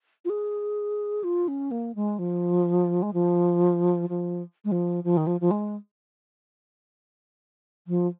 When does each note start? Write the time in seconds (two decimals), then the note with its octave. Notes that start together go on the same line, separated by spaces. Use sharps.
0.25 F4
0.29 G#4
1.24 F4
1.48 C#4
1.71 A#3
1.95 G#3
2.19 F3
3.02 G#3
3.13 F3
4.09 F3
4.65 G#3
4.72 F3
5.04 F3
5.17 D#3
5.27 F3
5.41 F3
5.51 G#3
7.87 F3